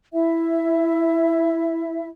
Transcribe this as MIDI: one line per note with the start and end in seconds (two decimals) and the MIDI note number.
0.13 2.07 64
0.13 2.07 76